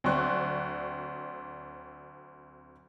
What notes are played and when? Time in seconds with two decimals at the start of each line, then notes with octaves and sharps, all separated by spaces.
0.04 D2 F#3 C4 D5 C#6 F#6